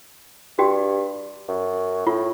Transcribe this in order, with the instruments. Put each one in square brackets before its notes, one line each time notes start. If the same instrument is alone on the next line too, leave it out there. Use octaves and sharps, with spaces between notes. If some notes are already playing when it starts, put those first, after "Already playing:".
[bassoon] G2 [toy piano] F#4 G4 G5
[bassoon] F#2
[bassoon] A2 [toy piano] F4